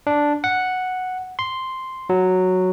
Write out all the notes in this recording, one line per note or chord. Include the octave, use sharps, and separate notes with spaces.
D4
F#5
C6
F#3